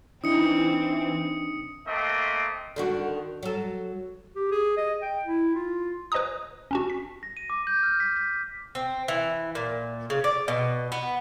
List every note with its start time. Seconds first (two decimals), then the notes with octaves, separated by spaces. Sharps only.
0.24 E3 C4 D4 D#4 D#6 C#7
1.87 A3 A#3 C4 D#5
2.76 D3 D#3 F#4
3.43 F#3 A4
4.36 G4
4.51 G#4
4.77 D#5
5.02 G5
5.25 E4
5.55 F4
6.12 B4 C5 D#5 G#5 A#5 D#6
6.71 C#4 D4 F#4
6.90 B6
7.23 A#6
7.37 D#7
7.50 D6
7.67 G6
7.83 F6
8.00 B6
8.16 B6
8.75 C4
9.08 E3
9.55 A#2
10.10 C#3
10.24 D5
10.48 B2
10.92 B3